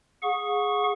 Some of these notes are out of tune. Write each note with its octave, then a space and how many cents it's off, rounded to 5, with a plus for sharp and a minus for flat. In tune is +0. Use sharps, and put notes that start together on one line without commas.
G#4 +0 F#5 -40 C#6 +0